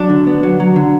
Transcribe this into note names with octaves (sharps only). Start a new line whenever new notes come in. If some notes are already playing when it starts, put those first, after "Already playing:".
Already playing: F#3 D4
D3
B3
F#3
F#3
D3